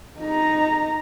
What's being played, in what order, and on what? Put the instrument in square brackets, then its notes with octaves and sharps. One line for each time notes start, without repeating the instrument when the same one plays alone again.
[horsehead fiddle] D#4 A#5